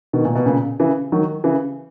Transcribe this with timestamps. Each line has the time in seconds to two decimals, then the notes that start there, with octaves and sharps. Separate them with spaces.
0.13 B2 D#3
0.25 A#2
0.35 B2
0.46 A#2 C#3
0.79 C#3 E3
1.12 D#3 F#3
1.44 C#3 E3